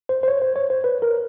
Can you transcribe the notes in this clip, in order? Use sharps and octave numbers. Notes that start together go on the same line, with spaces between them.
C5
C5
C#5
C5
C#5
C5
B4
A#4